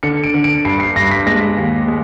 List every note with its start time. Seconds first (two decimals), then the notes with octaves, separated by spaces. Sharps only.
0.03 D3 C#7
0.24 D7
0.34 D3
0.44 D7
0.65 G2 C7
0.80 C7
0.96 G2 A#6
1.11 B6
1.26 G#3 A#6
1.57 D#2
1.88 G#3